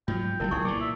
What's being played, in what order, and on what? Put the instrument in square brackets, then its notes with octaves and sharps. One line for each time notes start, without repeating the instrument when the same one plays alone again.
[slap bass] G#2 F#3 [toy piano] F4 [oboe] G5
[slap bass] F#1 C#3 G3 [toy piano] E4 A#4
[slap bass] B1 [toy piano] E4 C#6 [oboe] G#4
[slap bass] A#2 E3 [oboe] D5
[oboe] E5